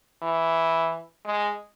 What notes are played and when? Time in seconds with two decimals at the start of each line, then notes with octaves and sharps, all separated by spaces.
0.22 E3
1.26 G#3